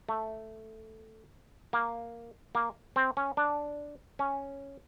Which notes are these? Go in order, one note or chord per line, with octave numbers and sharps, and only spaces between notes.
A3
A#3
A#3
C4
C#4
D4
C#4